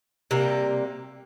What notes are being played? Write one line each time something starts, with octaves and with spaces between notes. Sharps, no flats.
C3 G3 A#3